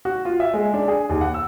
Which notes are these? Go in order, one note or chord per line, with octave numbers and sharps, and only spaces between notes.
F#4
F4
E5
G#3
D4
G#4
D#2
F#5
E6